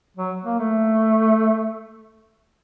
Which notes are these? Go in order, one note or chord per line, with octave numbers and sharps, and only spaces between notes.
F#3
A#3
A3